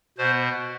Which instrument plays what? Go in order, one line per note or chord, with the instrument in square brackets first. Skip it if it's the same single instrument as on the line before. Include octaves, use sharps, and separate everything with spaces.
[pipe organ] B2 B3 C5